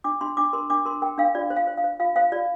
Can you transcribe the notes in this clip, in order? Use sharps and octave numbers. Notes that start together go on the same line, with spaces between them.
D4 D6
D4 C6
D4 D6
A#4 C6
D4 D6
A#4 C6
A#4 G5
D4 F5
F4 D5
C5
F5
C5
F5
C5
F4 F5
C5 F5
F4 D5